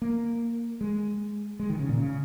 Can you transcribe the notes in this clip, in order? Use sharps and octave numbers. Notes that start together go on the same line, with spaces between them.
A#3
G#3
G#3
D#3
C#3
A#2
C#3